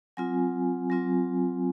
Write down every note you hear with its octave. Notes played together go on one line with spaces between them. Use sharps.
F#3 C4 F4 G#5
F#3 C4 F4